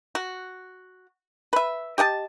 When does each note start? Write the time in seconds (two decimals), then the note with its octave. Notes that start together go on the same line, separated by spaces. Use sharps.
0.15 F#4
1.53 B4 E5
1.98 G4 D#5 F#5 A5